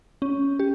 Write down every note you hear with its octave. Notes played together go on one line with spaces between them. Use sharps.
C#4
G4